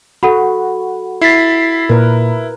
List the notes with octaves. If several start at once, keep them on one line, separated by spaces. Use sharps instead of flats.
F#4 A4 F#5 B5
E4 A6 B6 C7
A#2 A#4 B4